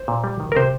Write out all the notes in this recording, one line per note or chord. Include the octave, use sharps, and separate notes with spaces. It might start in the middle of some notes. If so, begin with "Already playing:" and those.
Already playing: C5
A#2
G3
D#3
A#4
C3 C5